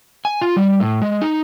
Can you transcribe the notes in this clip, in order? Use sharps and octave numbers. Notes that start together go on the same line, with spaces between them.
G#5
F4
G3
A2
G#3
D#4